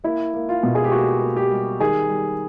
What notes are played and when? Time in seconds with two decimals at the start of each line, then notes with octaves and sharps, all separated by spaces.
0.04 A#3 E4
0.34 A#3
0.49 F4
0.63 B2
0.75 G#4
0.84 G4
0.92 A#3 F#4
1.21 A#3
1.37 G4
1.52 G3
1.80 D#3 G#4
2.09 G3